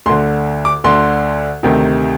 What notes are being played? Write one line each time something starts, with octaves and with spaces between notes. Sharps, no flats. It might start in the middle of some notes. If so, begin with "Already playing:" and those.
D2 D3 C6
D6
D2 D3 C6
D2 C3 D#3